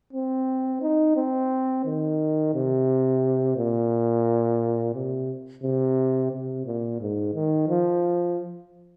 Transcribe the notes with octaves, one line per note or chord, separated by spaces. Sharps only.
C4
D#4
C4
D#3
C3
A#2
C3
C3
C3
A#2
G#2
D#3
F3